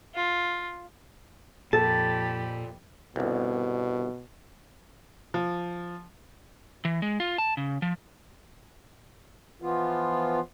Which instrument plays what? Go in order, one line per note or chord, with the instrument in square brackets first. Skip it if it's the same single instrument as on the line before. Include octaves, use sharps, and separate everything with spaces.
[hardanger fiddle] F4
[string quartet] F2 G4 B5 [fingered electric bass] A#2 [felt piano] A4 [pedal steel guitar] A5
[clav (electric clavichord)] G1 C2 [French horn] B2
[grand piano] F3
[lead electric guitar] E3
G#3
F4
A5
C#3
F3
[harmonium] E3 F3 B3 F4